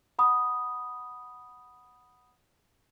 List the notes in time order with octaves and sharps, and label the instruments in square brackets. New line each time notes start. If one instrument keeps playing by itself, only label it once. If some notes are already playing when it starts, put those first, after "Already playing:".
[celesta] F#5 B5 D#6